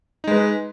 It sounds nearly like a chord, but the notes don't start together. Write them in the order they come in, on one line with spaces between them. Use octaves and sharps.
D#4 G#3 B4